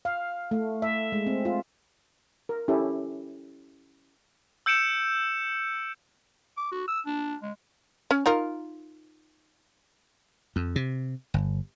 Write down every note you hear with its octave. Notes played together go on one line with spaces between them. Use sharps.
F5
A3
E5
G#3
C4
F4
A#4
C#4 E4 G4 A4
E6 G6 C#7 D7 E7
D6
F#4
E6
D4
G#3
C#4
D#4 F4 A#4
F2
C3
G1